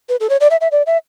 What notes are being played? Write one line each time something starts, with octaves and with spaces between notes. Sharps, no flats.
B4
A4
C#5
D5
E5
E5
D5
E5